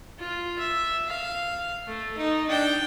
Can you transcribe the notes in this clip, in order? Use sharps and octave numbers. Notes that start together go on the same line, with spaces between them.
F4
E5
F5
A3
D#4
D4 G5